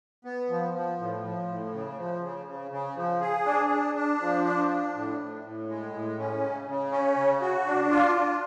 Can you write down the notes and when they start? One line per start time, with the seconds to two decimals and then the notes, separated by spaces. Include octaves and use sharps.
0.25 B3
0.49 F3
0.74 F3
0.98 A2
1.23 F3
1.48 A2
1.72 C#3
1.97 F3
2.22 C#3
2.47 C#3
2.71 C#3
2.96 F3
3.20 G#4
3.45 D4
3.70 D4
3.95 D4
4.20 F3
4.44 D4
4.68 D4
4.94 A2
5.18 A2
5.43 A2
5.68 G#3
5.93 A2
6.18 C#4
6.43 C#3
6.67 C#3
6.92 C#4
7.16 C#3
7.41 F#4
7.66 D4
7.91 F4
8.15 F4